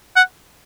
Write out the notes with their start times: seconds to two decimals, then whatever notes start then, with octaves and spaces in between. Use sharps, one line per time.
0.16 F#5